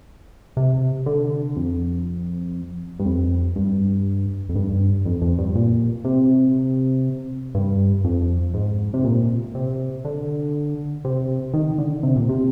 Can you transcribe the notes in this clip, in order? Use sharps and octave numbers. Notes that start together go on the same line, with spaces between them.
C3
D3
F2
G2
F2
G2
F2
G2
F2
F2
G2
A#2
C3
G2
F2
G#2
C3
A#2
C3
D3
C3
D#3
D3
C3
A#2
C3